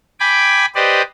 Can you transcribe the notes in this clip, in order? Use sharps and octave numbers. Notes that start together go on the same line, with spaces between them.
G5 G#5 B5 D6
G4 B4 C5 D5 D#5